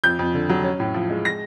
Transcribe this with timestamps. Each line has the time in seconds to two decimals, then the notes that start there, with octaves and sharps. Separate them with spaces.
0.04 F2 G6
0.19 F2
0.34 D3
0.49 F#3
0.64 C#4
0.80 A2
0.94 F3
1.10 G#3
1.25 A#6